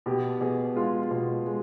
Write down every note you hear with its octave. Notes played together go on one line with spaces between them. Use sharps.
B2 G4
B2 G#4
G#3 F4
B2
G#3